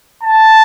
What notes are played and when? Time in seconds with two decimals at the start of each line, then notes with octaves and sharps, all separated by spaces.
0.23 A5